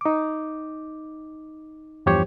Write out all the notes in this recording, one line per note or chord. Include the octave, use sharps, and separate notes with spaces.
D#4 D6
E2 G2 F3 G4 C5 C#5